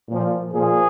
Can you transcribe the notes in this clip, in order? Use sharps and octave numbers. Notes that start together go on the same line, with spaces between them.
A#2
F3
A#2 F3 G#4